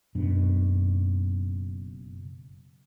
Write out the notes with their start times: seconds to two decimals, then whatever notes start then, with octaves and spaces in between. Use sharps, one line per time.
0.15 F#1 F#2 B2 D4